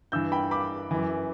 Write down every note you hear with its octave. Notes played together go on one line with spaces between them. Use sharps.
G2 E3 E6 G6
G5 B5
B5 D6
F#2 E3